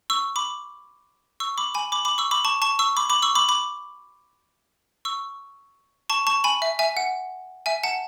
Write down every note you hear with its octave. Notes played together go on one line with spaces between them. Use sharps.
C#6 E6
B5 D6
C#6 E6
B5 D6
G#5 B5
B5 D6
B5 D6
C#6 E6
B5 D6
A5 C#6
A5 C#6
C#6 E6
B5 D6
B5 D6
C#6 E6
B5 D6
B5 D6
C#6 E6
A5 C#6
A5 C#6
G#5 B5
E5
E5 G#5
F#5
E5 G#5
F#5 A5